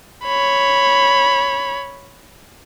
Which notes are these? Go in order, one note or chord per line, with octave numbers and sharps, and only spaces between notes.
C#5 B5